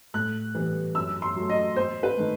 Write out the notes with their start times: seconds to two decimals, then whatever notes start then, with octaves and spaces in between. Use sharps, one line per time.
0.14 A2 F#6
0.55 E3 G3 B3
0.95 F#2 E6
1.22 C6
1.35 F#3 A3
1.50 D#5
1.76 E2 C5
2.03 B4
2.17 D#3 A3